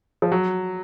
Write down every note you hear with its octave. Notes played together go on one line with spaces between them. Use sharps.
F3
F#3